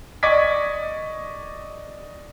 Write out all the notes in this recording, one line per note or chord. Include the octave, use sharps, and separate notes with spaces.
D5 D#5 C#6 D6 G#6 B6